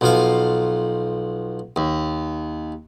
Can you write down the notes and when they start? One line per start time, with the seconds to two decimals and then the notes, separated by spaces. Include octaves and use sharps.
0.01 B1 F3 F5
1.76 D#2